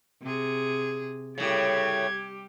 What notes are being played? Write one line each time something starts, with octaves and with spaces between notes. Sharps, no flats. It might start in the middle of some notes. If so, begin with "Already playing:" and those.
C3 G#4
A2 C#3 G3 G4 G#6